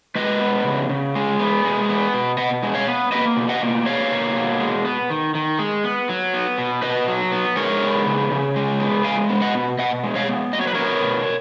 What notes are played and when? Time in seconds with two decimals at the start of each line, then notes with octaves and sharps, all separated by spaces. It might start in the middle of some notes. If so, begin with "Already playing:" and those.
0.15 G#3 B4 D#5
0.41 B3
0.65 C#3
0.89 C#3
1.15 G#3
1.39 B3
1.64 G#3
1.89 B3
2.14 B2
2.38 B2 D#5 F#5
2.63 G#3
2.75 C#5 F5
2.88 B3
3.12 A#3 B4 D#5
3.37 B2
3.49 D#5 F#5
3.61 A#3
3.86 B2 C#5 F5
4.12 A#3
4.36 B2
4.60 G#3
4.85 B3
5.10 D#3
5.35 D#3
5.59 G#3
5.84 B3
6.09 F#3
6.34 B3
6.58 B2
6.82 B2 B4 D#5
7.08 F#3
7.32 B3
7.56 G#3 A#4 C#5
7.82 B3
8.06 C#3
8.31 C#3
8.56 G#3
8.80 B3
9.04 G#3 F5 G#5
9.29 B3
9.42 D#5 F#5
9.55 B2
9.79 B2 D#5 F#5
10.04 G#3
10.15 C#5 F5
10.28 B3
10.53 F#3 D#5
10.61 C#5
10.67 B4
10.74 B3 A#4 C#5
11.02 B2